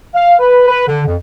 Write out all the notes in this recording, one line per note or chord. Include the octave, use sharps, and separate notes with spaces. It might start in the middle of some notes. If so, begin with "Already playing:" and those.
F5
B4
B4
D3
F2